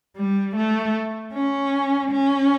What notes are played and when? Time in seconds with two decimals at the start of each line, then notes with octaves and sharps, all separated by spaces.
0.17 G3
0.56 A3
1.34 C#4
2.11 C#4